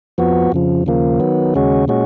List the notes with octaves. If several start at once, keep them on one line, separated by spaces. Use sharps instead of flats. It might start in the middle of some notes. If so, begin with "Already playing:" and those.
F2 F3 B3 F#4
F2 C#3 F3
D#2 C#3 F3 A#3
D#3 F#3 B3
D#2 C#3 G#3 C#4 F#4
A#2 G#3 C#4 F#4